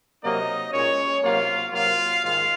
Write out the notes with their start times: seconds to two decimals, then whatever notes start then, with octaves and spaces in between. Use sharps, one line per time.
0.22 C3 F#3 A#3 D#4 D#5
0.72 A#2 G#3 C#4 C#5
1.22 C3 F#3 A#3 F4 F5
1.72 C3 F#3 A#3 F4 F5
2.22 G#2 D#3 G#3 F4 F5